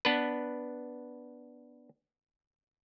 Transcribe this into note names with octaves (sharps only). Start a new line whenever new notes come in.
B3 D4 B4